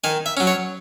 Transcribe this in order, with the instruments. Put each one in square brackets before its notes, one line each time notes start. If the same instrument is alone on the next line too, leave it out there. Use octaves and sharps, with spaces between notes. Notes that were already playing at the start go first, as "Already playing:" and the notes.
[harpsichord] D#3 G#5
E5
F#3 C#4
C#5